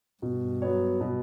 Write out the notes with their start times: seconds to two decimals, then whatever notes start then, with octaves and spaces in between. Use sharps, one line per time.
0.22 G2 B2
0.62 F#3 B3 F#4 C#5
1.00 B2